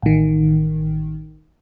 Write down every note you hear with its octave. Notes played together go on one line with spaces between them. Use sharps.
A1 D#3